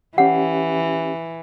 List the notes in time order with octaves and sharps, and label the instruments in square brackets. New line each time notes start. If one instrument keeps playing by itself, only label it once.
[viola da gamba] E3 [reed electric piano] C#4 G4 [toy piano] F#5